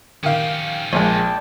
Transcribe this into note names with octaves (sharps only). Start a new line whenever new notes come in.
D#3 C#4 G4 F5
A#1 G#3 D5 G5 A5